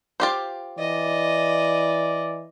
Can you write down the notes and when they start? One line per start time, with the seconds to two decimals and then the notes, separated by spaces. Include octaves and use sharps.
0.20 F4 G4 C5
0.79 E3 D5 D#5